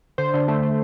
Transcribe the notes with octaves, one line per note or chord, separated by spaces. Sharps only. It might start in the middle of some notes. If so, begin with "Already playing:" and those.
D3 C5
D3
A3
A3